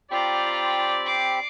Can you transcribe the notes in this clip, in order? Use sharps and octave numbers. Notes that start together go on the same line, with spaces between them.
C4 F4 G4 D5 A#5 B5
D6 C7